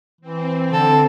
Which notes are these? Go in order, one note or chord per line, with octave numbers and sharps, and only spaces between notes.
E3 C4
D3 A4